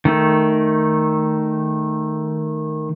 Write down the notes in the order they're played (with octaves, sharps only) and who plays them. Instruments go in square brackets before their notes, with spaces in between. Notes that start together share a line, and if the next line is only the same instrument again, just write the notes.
[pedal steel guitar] D#3 A3